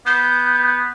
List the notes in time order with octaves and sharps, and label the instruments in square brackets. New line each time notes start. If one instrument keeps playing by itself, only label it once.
[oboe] B3 [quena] G6